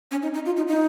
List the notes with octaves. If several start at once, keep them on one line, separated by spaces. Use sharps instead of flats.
C#4
D#4
D#4
F4
D#4
D#4